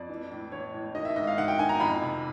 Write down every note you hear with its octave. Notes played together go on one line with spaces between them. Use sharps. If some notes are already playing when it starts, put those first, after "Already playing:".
Already playing: F2 D5
E3
A2
E3 C#5
A2
D#3 D#5
E5
G#2 D#5
F5
D#3 F#5
G5
D#3 G#5
A#5
F2 B5
C3